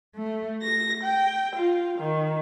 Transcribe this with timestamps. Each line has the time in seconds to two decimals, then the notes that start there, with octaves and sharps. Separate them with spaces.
0.15 A3
0.61 A#6
1.03 G5
1.56 F4
1.98 D#3